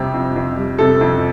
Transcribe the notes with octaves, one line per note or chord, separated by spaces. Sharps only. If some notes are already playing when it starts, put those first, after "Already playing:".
Already playing: F2 C3 G3 G4
F2
F2
G3
C3 A4
F2